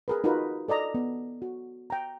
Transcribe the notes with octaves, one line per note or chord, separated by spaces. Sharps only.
G#4 A#4 B4
D#4 F4 F#4 A#4 B4
A4 D5 D#5 A#5
B3
F#4
G5 A#5